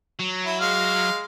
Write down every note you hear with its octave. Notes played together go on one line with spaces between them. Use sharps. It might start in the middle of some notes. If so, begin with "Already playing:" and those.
F#3
E4
G#3 F5